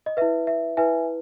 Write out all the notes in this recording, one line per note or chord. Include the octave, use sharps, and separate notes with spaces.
D#5
E4 B4 E5
E5
E4 B4 E5 G#5